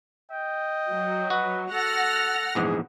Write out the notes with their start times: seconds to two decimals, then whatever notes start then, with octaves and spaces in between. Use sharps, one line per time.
0.31 D#5 G5
0.90 F#3
1.30 F#4 B4
1.73 A4 F#5 F6 A#6
2.55 A#1 E2 G#2 G#4